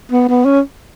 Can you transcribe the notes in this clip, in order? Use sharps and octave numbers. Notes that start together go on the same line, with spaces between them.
B3
B3
C#4